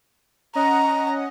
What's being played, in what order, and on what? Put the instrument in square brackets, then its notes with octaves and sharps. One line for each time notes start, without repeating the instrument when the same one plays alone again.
[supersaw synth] C#4 D#5 F#5 [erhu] A#5